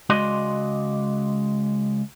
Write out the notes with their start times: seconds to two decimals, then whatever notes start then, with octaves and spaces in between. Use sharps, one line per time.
0.09 C#2 G#3 F#4 D5 D#5 C6